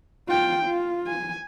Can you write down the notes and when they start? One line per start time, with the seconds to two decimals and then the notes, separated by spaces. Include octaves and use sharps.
0.28 F4 G5
0.65 F4
1.07 G#5